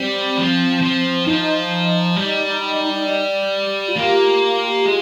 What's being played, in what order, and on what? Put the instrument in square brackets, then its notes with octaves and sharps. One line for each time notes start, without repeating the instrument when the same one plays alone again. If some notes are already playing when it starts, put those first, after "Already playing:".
Already playing: [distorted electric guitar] G3 [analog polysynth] C4
[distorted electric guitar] F3
F3
[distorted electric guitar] F3 [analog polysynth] D#4
[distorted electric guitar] G3
[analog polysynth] F4
[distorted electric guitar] A#3 [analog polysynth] G4
[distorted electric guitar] G#3